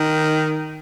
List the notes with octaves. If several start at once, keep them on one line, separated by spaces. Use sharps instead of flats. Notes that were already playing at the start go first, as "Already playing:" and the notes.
Already playing: D#3